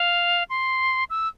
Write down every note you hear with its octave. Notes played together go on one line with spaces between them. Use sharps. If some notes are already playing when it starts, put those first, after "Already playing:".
Already playing: F5
C6
E6